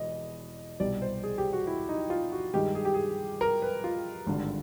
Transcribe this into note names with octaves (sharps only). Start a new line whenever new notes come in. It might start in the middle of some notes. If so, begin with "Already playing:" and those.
Already playing: E1 E2 D#5
C2 B2 G3 D5
C5
G#4
G4
F#4
E4
D#4
F4
F#4
G2 D#3 G#3 G4
G#4
G4
G#4
A#4
B4
F4
G#1 G2 D3 G3